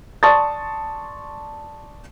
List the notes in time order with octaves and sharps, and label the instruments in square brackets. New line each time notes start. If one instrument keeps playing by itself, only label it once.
[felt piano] D5 A5 C6 C#6 D#6 A6